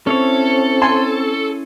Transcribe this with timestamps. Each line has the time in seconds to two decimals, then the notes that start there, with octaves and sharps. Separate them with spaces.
0.07 C4 C#4 E4 A4 C#5
0.82 G#5 A5 C6